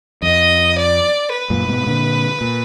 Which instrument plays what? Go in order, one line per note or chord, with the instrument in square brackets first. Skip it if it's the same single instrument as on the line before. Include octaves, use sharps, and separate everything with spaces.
[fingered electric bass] F2 [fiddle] D#5
[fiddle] D5
B4
[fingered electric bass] F#2 A#2
G#2 B2
A#2 D3
A#2